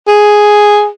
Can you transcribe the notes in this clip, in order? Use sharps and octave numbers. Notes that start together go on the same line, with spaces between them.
G#4